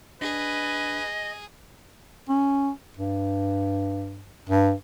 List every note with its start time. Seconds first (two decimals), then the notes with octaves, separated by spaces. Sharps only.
0.22 D4 G#4 B4 D#5
2.29 C#4
2.97 G2
4.49 G2